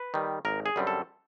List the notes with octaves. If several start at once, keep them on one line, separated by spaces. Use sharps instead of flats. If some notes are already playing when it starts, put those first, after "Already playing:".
Already playing: B4
D#3 G3
G#1 A#4
G#4
F#2 D3 G3 C4
A4